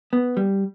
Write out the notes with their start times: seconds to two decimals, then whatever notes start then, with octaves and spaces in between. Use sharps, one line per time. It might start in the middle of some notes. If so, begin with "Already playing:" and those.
0.13 B3
0.37 G3